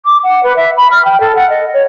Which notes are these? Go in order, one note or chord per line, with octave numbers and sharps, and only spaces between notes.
D6
F#5
B4
E5
B5
F6
G5
A4
F#5
D#5
C#5